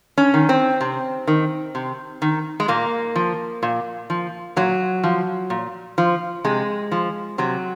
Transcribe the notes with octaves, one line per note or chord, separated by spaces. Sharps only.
C#4
D#3
C4
C3
D#3
C3
D#3
G#3
A#2 A#3
F3
A#2
F3
A#2 F#3
F3
A#2
F3
C3 G#3
F3
C3 F#3